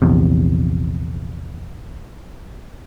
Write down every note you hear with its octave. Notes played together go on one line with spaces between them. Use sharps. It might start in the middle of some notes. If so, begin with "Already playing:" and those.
A#1 E2 C3